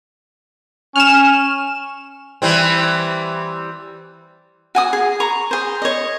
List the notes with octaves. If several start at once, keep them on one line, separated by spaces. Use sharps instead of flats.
C#4 F6 E7
E3 G3 C4
F#4 G#5 D#6
G#4
A#5 C#6
G#4 C5
C#5 D#5